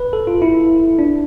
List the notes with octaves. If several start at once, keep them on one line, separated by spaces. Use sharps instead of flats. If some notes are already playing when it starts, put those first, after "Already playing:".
Already playing: B4
A4
F4
E4
D4